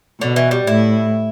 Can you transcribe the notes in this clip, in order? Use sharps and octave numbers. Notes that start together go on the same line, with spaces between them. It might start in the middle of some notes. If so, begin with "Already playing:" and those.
B2 D3
E3
G3
A2 E4